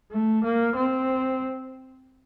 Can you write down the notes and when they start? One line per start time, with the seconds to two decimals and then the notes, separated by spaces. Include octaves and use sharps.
0.12 A3
0.44 A#3
0.76 C4